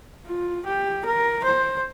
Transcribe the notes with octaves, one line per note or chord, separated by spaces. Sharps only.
F4
G4
A#4
C5